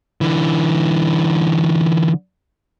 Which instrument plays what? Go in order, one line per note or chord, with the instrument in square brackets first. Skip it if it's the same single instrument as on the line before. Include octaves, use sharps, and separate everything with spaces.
[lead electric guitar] D3 E3